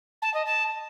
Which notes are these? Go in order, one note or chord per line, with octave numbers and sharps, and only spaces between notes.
A5
D#5
A5